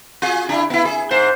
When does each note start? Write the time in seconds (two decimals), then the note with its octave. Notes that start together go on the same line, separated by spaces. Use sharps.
0.22 F4 G#4
0.49 D4 E4
0.70 B3 E4
0.85 G#4
1.11 G#2 C5